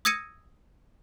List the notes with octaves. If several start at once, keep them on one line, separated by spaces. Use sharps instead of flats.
D#6 E6 G#6 A#6 C#7 D#7